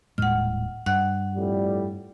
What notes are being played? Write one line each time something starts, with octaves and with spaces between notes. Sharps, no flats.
D#1 A2 G#3 F#5 F6
G2 F#5 F#6
F2 A2 G3